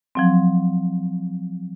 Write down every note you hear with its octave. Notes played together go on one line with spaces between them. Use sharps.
F3 F#3 C4